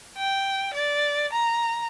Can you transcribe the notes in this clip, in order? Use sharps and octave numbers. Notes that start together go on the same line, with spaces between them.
G5
D5
A#5